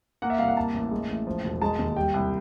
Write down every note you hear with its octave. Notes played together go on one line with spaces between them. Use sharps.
A#3 F#5
E5
C2 F5
F#5
A#3 A5
A1
G#3
A1
F3
E1
G#3 A5
D#2
G3 G5
C2